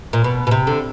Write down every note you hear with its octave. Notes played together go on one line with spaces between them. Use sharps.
A#2
B2
B2
C3
D3